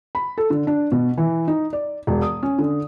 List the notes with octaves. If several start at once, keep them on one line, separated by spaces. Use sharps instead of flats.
B5
A4
D3
D4
B2
E3
D#4
D5
E1
D#6
C#4
D3